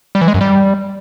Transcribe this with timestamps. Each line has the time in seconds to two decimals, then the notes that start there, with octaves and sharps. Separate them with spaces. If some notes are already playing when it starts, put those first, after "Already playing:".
0.15 G3
0.21 E3
0.28 G#3
0.34 F#2
0.41 G3